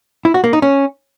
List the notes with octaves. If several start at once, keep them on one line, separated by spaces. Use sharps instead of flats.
E4
F#4
A#3
D#4
C#4